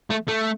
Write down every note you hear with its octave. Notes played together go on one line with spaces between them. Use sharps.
A3
A3